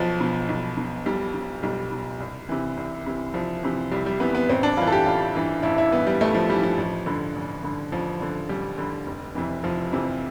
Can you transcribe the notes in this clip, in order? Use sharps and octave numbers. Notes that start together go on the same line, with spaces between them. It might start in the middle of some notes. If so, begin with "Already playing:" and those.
Already playing: B1 F3
B2
B1
B2
B1 G3
B2
B1 G3
B2
C2
C3 E3
C2
C3 E3
C2 F3
C3 E3
C2 G3
G3
C3 E3 B3
B3
A1 C4
D4
G2 E3 F4
A4
G4
A1 F4
G2 E3
A1 E4
E4
G2 E3 B3
G3
A1 A3
F3
G2 E3 G3
F3
A1
G2 D3
A1
G2 D3
A1 F3
G2 D3
A1 G3
G2 D3
F1
F2 C3 E3
F1 F3
F2 C3 E3